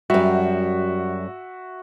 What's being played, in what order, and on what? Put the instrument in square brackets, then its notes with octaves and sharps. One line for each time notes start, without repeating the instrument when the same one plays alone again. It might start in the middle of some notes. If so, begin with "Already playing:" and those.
[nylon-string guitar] F#2 G3 [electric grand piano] F#4 E5